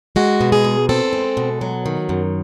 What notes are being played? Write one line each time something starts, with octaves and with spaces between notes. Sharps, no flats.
G#3 F#4
B2
G#4
E2
C4 A4
G#3
B2
F#3
D#3
F#2